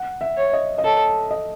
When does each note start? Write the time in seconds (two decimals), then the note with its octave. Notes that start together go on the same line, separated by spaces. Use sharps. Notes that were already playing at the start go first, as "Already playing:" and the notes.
Already playing: F#5
0.21 E5
0.37 C#5
0.53 D#5
0.78 D#5
0.84 A4 C#5
1.31 D#5